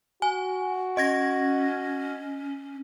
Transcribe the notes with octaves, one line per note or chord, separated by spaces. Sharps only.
F#4 G#5
C#4 D#5 G#6 A#6